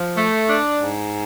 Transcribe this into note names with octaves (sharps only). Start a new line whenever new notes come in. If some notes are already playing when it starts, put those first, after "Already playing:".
Already playing: F3
A3
D4
G#2